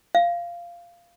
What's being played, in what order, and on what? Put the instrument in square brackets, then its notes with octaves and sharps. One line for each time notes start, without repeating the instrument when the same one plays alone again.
[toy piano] F5